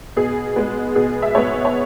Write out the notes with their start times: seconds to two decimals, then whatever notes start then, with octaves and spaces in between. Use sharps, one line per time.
0.16 B2 G#4
0.56 G#3 B3
0.95 B2 G#4
1.22 E5
1.35 G#3 B3 C#5
1.65 C#5